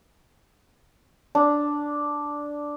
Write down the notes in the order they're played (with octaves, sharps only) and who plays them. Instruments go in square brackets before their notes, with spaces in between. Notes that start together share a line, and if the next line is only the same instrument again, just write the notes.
[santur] D4